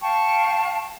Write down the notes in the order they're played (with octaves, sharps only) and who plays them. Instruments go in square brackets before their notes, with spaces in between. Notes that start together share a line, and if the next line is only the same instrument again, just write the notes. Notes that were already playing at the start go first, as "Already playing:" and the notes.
[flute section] F5 G5 A5 C#6